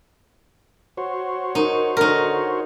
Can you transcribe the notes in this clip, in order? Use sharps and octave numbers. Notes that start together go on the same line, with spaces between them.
F#4 C5 C#5
D#4 A#4
D3 D#4 A#4